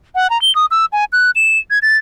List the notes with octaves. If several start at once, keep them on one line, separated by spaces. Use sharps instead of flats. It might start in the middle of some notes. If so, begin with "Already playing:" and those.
F#5
A#5
G7
D#6
E6
G#5
F#6
E7
G#6
A6